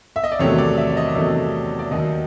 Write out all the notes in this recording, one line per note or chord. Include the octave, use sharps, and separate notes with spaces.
E5
D#5
D5
E2 C3 D#3 F#3 A3 C#5
D5
E5
D#5
E2 C3 D#3 F#3 A3
D5
D#2 D#3 F#3 D#5